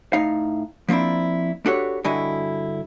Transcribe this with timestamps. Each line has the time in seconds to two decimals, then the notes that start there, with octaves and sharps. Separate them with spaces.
0.13 A2 D#4 F5
0.89 F3 A#3 C4 D4 E4
1.66 D4 F#4 G4 A4 B4 C#5
2.04 G2 D3 E4 F#4 D#5 G#5